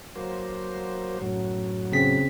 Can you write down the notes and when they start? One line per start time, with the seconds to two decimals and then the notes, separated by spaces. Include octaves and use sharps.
0.16 F#3 A#3 C5
1.22 F#2 A2 F#3
1.92 C#3 C4 B6